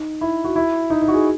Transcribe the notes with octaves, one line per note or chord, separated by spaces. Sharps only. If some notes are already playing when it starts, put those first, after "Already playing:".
Already playing: D#4
E4
F#4
E4
D#4
D#4
F#4
G#4